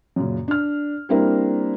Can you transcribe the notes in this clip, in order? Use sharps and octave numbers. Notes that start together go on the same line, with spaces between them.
F#2 A#2 C#3
D4 F6
G3 A#3 C4 D4 E4 A#4